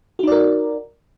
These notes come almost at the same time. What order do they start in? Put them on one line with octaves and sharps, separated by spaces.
F#4 D#4 D5 A#4